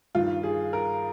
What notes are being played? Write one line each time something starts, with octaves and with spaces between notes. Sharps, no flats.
G2 D#3 F4
G#4
A#4